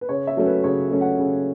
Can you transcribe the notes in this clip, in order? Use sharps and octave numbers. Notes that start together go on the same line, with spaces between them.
B4
C#3 C#5
E5
F#3 A3 C#4
B4
C#3 C#5
F#3 A3 C#4
F#5
C#3